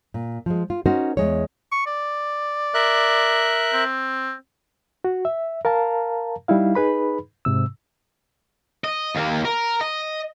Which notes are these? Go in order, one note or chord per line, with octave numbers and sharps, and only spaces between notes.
A#2
F3 G#3
F4
C#4 D#4 F#4 A#4 C5
E2 G#3 C#5
C#6
D5
A#4 E5 F#6
C4
F#4
E5
A#4 F5 A5 A#5
G3 D#4 E4 F5
D#4 G#4 B4 B5
G#2 C3 E6
D#5
D#2 A#3
A#4
D#5